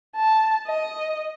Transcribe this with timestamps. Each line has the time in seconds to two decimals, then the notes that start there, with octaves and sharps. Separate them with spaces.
0.16 A5
0.67 D#5